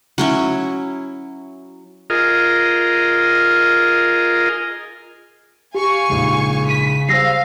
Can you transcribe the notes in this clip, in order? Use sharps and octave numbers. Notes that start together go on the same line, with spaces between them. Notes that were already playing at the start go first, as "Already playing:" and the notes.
F#3 C#4 E4
F4 G#4 A#4 D#5
G4 F5 G#5 C#6
A#1 G#2 C#3
B6 D#7
G3 G#4 C5 F5 E6 A#6 C7